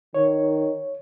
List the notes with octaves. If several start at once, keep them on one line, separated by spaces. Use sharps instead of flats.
D#3 C#5